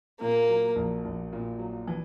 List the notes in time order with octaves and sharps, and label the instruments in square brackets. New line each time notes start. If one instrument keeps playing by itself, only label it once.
[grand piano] A#2 [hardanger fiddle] A#3
[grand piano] F#3
A#1
A#1
A#2
F#3
E3